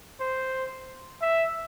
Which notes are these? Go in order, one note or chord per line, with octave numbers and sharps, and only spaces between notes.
C5
E5